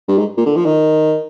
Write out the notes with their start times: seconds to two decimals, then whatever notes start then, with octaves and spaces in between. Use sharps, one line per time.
0.08 G2
0.18 G#2
0.37 A#2
0.46 D3
0.56 F3
0.65 D#3